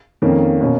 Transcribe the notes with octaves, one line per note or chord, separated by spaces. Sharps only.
F2 D#3 A#3 C#4
B2 A#3 C#4